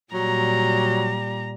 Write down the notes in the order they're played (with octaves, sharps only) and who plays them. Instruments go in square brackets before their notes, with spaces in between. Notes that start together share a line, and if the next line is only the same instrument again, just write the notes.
[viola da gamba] A#2 G3 [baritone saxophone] F#3 [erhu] A#5